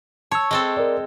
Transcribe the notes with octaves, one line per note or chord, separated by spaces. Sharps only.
C#5 A5 C#6 E6
G#3 C4 A4
A#4 D5